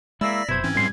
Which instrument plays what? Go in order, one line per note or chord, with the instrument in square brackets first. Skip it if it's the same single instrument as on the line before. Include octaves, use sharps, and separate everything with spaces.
[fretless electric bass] G#3 [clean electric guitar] A#3 E4 [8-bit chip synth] D5 A#6 B6 [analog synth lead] E6
[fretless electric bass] F1 F#2 B2 [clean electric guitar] E4 C5 [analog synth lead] G#6
[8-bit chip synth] G#2 C4 C#4 [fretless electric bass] E3
[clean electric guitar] F#2 C6 [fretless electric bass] A2 F#3 G3